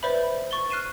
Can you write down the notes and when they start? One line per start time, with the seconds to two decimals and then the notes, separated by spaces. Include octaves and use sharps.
0.03 B4 C5 D5 E5 B5
0.51 C#6 A6 G7
0.70 F6 F#6 C7 D#7 E7